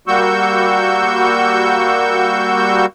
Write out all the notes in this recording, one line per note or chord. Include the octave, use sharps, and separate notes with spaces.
G3 A#3 F#4 C#6 E6 G6